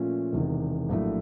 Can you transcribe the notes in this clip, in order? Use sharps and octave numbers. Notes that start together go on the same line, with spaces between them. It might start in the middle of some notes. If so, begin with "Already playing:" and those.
Already playing: A#2 F3 A3 C#4 F4
E1 E2 C3 D#3
A#1 A2 F#3 A3